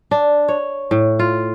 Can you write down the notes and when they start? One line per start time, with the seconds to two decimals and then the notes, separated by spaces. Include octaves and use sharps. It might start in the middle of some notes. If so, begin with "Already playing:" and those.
0.11 D4
0.48 C#5
0.91 A2
1.19 F4